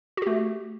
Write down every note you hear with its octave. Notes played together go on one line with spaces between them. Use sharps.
A3 F#4 G4